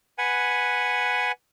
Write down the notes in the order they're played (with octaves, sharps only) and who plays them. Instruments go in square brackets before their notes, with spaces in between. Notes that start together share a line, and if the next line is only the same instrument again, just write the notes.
[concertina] B4 F#5 G#5